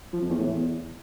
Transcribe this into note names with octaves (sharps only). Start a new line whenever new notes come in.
F3
F2
E2
A2
E2